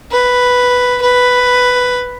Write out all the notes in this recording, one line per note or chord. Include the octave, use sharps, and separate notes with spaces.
B4
B4